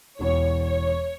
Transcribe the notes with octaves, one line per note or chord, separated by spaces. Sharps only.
E1 E2 B2 C#5
C#5